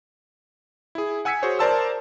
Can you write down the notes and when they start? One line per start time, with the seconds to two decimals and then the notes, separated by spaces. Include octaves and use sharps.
0.95 E4 G#4
1.25 F#5 G#5 E6 G#6 B6 C#7
1.42 F#4 G#4 C5 C#5
1.59 A#4 C5 D5 A5 C6 E6